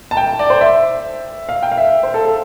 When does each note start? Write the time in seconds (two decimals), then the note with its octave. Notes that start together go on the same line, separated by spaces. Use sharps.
0.11 A5
0.17 G5
0.39 D5
0.50 C5
0.61 E5
1.49 F5
1.63 G5
1.72 F5
1.78 E5
2.03 C5
2.14 A4
2.25 A4